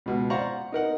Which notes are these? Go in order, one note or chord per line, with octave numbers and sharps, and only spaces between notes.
C#2 B2
C5 D5 F5 F#5 A#5 C#6
D#4 A#4 F#5